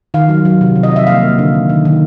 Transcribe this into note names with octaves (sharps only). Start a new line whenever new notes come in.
D#3 F5
F#3
F#3
C3
F3
D#5
F3 E5
A#3 F5
A#3
D3
D#3
D#3
D#3